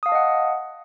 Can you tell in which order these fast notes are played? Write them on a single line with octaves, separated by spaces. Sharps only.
D#6 F5 A5 D#5 F#5